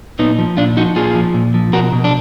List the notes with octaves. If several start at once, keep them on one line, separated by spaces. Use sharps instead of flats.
A#2 B3 D#4
F3
A#2 D4 F4
F3 D#4 F#4
A#2 F4 G#4
F3
A#2
F3
B2 F#4 A#4
B2
D4